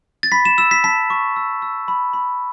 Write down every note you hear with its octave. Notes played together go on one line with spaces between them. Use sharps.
A6
B5 B6
E7
E6 E7
B6
A5 B6
C#6
E6
E6
B5
B5